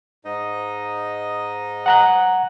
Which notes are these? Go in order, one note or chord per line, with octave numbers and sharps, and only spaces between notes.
G#2 D#4 D#5
F#5 A#5 F#6